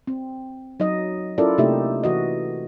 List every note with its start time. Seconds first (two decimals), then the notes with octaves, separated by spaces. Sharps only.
0.07 C4
0.80 F#3 D#4 F#4 D#5
1.38 C#4 E4 F4 A4 A#4 D5
1.58 C3 A3 A#3 D#4 G4 E5
2.04 E3 F#4 D#5